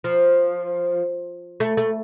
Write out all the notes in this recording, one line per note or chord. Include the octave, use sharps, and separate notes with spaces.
F3
A3
A3